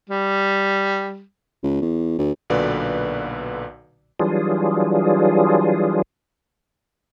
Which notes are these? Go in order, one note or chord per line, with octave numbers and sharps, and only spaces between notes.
G3
C#2
E2
D2
B1 A#2 D3 F#4 B4 D5
E3 F#3 G3 D4 F4 G#4